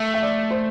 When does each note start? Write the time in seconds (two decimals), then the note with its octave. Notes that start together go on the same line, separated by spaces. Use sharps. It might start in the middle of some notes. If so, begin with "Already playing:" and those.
Already playing: A3 E5
0.14 E5
0.22 D5
0.51 C5